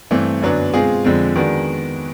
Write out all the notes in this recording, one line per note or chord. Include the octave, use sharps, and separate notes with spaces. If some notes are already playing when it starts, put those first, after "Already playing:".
G2 E3 A3 C4
F#2 D3 F#3 B3 D4
B2 G#3 C4 F4 G#4
F2 D3 F3 G#3 C4
D#3 G#3 B3 D4 F#4